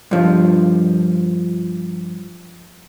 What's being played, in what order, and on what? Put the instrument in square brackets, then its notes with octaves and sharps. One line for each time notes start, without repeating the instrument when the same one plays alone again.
[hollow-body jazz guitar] G2 F3